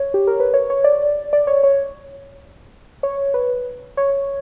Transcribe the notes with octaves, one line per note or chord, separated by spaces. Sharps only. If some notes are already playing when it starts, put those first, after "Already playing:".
Already playing: C#5
G4
A#4
B4
C#5
C#5
D5
D5
C#5
C#5
C#5
B4
C#5